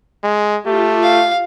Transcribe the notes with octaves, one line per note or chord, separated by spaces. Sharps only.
G#3
A3 F4 G4
F5